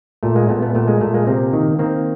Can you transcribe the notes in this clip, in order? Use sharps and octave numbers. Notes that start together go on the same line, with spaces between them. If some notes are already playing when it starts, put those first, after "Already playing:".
A#2 A3
G#3 A#3
A#2 A3 B3
A3 B3
A#2 A3 B3
G#3 A#3
A#2 A3
G#3 A#3
C3 A#3 C4
D#3
D#3 A#3 C4